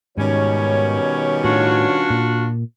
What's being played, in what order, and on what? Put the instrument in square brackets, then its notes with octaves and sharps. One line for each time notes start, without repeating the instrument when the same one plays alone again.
[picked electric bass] G#2 [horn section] B2 G3 C#4 [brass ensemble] D#3 C#5
[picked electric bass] A2 [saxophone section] D4 F4 F#4
[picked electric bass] A#2